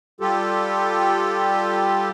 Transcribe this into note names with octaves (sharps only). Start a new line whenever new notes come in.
G3 F4 G4 A4